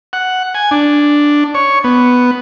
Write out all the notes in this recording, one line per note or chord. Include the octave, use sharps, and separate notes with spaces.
F#5
G#5
D4
C#5
B3